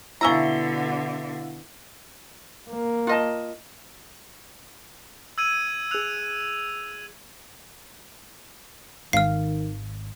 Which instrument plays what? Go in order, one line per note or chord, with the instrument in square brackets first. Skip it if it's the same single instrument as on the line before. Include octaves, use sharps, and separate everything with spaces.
[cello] B2 D3 [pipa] C#4 E5 A#5 [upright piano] E4 F5 G7
[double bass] A#3
[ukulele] F4 D#5 A5
[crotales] E6 G#6 D#7
[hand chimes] G#4 F#6 [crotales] E6 F7
[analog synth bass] G#1 [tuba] D#3 [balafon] F5 [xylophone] F6 C7